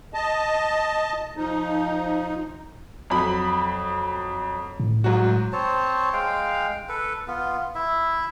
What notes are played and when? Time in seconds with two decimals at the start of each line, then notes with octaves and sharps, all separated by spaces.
0.14 D#5 A5
1.37 F3 D#4
3.10 F2 F#3 B5
4.80 A2
5.04 G#2 F#3 F#4
5.53 C4 C5 C#5 A5
6.13 G#3 F5 G5
6.89 A4 B4
7.28 B3 F4
7.75 E4 E5